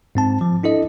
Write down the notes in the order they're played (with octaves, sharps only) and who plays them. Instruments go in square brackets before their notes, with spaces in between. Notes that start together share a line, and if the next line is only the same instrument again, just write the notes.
[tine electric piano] G#2 C4 A5
F3
D4 E4 A4 D#5